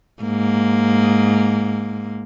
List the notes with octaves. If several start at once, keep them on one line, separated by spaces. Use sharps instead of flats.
G#2 A#3